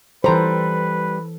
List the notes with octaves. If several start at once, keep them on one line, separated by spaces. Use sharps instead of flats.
E3 G3 A4 B4 C5 A#5